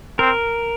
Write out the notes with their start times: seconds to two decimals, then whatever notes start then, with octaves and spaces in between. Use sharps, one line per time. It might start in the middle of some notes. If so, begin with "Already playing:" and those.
0.19 C4 A#4